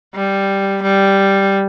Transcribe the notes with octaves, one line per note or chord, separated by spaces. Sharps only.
G3
G3